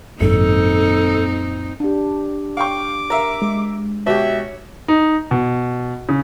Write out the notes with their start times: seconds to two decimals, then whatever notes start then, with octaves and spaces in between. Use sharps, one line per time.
0.21 G#1 F#2 A#2 C4 D#4 A4
1.80 D4 G4
2.57 F5 G5 C#6 D6
3.10 A#4 E5 F5
3.42 G#3
4.07 B2 G4 C#5 E5
4.88 D#4
5.31 B2
6.09 C#3